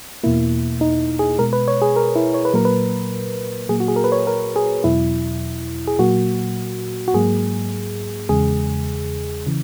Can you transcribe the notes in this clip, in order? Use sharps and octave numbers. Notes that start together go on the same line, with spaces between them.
E2 B2 A#3 E4
D#4
G#4
B2 G#3 A#4
B4
C#5
G#4
A#4
E4
C#5
B4
A#2 F#3 A#3 A#4
B4
A#2 F#3 A#3 G#4
F#4
G#4
A#4
B4
C#5
A#4
G#4
E2 B2 F#3 E4
G#4
A#2 F#3 A#3 F#4
F#4
G#2 F#3 A#3 G#4
E2 C#3 G#3 G#4
C#3 E3